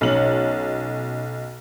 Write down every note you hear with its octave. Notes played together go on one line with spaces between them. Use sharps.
B1 C#4 D#4 F#7